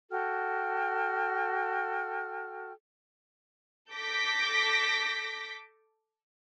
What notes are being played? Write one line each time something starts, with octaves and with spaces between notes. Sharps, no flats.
F#4 A4 G5 F6
A4 D6 G6 A#6 B6